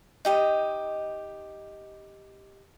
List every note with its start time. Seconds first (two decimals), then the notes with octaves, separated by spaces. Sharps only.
0.25 D#4 G4 D#5